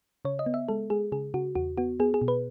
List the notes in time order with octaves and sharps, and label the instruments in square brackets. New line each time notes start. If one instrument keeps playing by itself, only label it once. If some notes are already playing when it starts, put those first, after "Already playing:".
[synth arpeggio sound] C#3 C#5
D#5
B3
E5
G#3 A4
G#3 G#4
C#3 G#4
C#3 F#4
E2 F#4
B3 F#4
B3 G#4
G#4
B2
B4